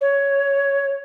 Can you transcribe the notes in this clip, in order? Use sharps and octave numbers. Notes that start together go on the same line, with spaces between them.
C#5